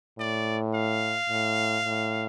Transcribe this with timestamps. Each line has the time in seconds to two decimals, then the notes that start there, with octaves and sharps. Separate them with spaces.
0.19 A2 D5
0.74 F5
1.29 A2
1.84 A2